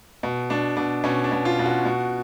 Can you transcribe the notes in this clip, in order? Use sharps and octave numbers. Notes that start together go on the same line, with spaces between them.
B2
B2 D4
B2 D4
B2 C#4
D4
B2
F4
B2
F#4
B2